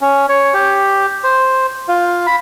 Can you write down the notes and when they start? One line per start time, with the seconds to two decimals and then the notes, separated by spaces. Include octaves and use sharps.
0.01 C#4
0.29 C#5
0.54 G4
1.24 C5
1.88 F4
2.27 B5